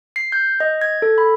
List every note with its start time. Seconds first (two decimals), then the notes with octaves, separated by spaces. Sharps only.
0.16 C7
0.32 G6
0.60 D#5
0.81 G#6
1.02 A4
1.18 B5